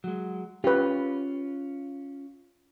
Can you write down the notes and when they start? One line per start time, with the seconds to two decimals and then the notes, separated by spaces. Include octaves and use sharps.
0.04 F#3 G#3
0.64 C#4 F4 G4 B4